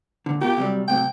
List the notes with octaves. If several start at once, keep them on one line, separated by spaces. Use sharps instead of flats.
A#2 D3
B2 F4 G4 A#4
C3 F#3 G3
A2 C3 F#3 G5